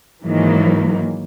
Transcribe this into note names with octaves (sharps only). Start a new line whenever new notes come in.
G#2 D#3 E3 F#3 A#3